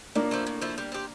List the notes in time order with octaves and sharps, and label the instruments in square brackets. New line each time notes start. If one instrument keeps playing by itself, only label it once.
[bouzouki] A2 [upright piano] A#3 D4
[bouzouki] F3 A3 E4
A2
F3 A3 E4
G3
C4 G4